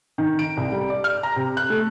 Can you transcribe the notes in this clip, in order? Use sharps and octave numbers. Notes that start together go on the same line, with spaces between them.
D#3
D7
C2
G3
D5
F6
A#5
C3
F#6
A3